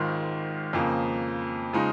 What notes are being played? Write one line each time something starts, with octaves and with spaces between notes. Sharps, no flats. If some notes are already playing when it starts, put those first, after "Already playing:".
Already playing: G#1 G#2 D#3 G#3 F4
F2 C#3 F3 A#3
C#3 F3 G#3 D#4